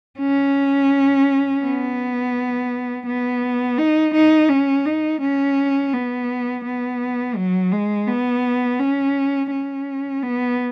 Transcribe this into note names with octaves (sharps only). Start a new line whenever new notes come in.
C#4
B3
B3
D#4
D#4
C#4
D#4
C#4
B3
B3
F#3
G#3
B3
C#4
C#4
B3